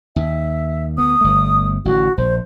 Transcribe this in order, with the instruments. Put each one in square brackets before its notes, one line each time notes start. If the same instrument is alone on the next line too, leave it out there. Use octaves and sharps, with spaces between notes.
[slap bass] D#2 [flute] E5
[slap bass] D2 B3 [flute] D#6
[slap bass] G1 A3
[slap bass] A1 D3 [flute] F#4
[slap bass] A#1 [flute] C5